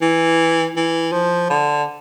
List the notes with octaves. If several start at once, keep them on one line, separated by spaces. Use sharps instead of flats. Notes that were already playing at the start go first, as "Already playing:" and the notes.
E3
E3
F3
D3